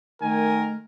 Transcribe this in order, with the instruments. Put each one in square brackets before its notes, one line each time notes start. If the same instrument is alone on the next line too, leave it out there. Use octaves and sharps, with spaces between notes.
[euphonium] D#3 [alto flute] A3 [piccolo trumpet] A#4 [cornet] G#5